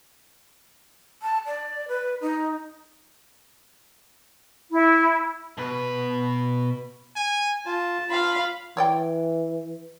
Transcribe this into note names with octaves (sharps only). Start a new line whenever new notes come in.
A5
D5
B4
D#4
E4
B2 B4
G#5
F4 A5
F4 F5 B5
E3 C#5 D5 G5